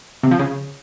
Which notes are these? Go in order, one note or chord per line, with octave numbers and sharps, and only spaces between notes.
C3
F3
C#3